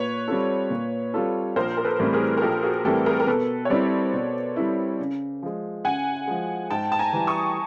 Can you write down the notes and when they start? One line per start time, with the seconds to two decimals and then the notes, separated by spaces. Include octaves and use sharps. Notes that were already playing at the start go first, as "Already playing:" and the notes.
Already playing: A#2 B4 C#5
0.28 G3 C4 F4 A4
0.70 A#2
1.14 G3 C4 F4 A4
1.56 A#1 A#4 C5
1.77 A#4
1.84 A4 B4
1.99 A2 E3 G3 C4
2.13 G#4 A#4
2.37 A#4
2.42 A#1 G4 A4
2.63 F#4 G#4
2.84 A2 E3 G3 C4 G4 A4
3.06 G#4 A#4
3.20 A#4
3.27 B2 A4 B4
3.65 C#5
3.70 G3 C4 E4 C5 D5
4.13 B2
4.56 G3 C4 E4
4.99 C#3
5.42 F3 G#3
5.85 C#3 F#5 G#5
6.27 F3 G#3
6.70 G#2 G5 A5
6.92 A5
6.99 G#5 A#5
7.13 E3 G3
7.27 C#6 D#6